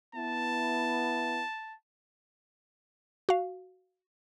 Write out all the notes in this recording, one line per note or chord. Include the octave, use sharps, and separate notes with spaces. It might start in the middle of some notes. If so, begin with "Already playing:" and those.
B3 E4 A5
F#4 F5